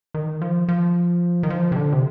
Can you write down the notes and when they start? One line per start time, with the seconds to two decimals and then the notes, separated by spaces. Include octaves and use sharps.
0.14 D#3
0.42 F3
0.69 F3
1.43 D#3
1.50 F3
1.72 C3
1.76 D3
1.92 C3